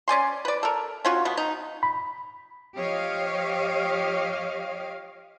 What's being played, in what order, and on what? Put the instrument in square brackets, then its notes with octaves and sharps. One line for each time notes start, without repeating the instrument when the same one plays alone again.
[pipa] C#4 D5 G#5 C6
B4 D5
A4 A#4
C#4 F4 F#4
B2 B3
D#4
[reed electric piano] B5
[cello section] F3 G4 C#5 D#5 F5